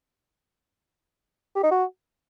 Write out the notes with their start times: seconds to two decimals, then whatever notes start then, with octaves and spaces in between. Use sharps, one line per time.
1.56 G4
1.63 D#4
1.71 F#4